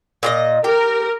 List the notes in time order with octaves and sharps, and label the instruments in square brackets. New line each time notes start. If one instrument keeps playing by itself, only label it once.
[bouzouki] A#2 G#4 D#5
[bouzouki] G4 [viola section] A#4